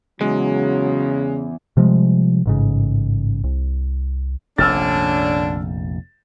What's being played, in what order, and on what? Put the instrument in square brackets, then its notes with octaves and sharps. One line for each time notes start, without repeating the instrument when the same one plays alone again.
[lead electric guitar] E2 [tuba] C#3 [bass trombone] F#3 [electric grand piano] G#3
[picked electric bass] C3 F3 G3 G#3
A1 G#2 C#3
C2
[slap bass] F1 A#1 [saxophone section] D3 C#4 D4 [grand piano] E6 F6 A6